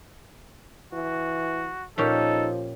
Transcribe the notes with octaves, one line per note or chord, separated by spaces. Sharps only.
E3 F#4
A#2 F3 C#4 D#4 G4 A4